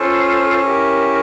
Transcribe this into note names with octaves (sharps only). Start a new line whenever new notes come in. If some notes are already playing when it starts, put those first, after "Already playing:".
Already playing: C#4 F4 A4 C5
E4 G4 A#4